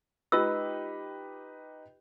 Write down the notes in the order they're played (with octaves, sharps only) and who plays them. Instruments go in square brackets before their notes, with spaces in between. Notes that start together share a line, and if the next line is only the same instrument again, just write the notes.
[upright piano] D#4 G4 B4 [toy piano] F4 E6